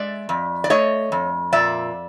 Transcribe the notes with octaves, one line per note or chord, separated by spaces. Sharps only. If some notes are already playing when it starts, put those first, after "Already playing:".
Already playing: G#3 D5 E5
F2
D5
A3 C#5 D#5
F2
A#2 D5 E5